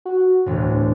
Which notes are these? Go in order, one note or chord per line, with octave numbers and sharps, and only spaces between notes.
F#4
E1 D2 A2